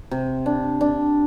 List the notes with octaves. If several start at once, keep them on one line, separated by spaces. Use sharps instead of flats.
C3
D4
D4